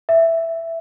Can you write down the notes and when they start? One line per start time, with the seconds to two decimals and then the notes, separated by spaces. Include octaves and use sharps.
0.09 E5